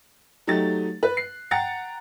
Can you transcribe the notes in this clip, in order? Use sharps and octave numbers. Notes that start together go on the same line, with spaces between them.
F#3 A3 D#4 G4 A6
B4 F#6
C7
F#5 G5 A#5 A6 C#7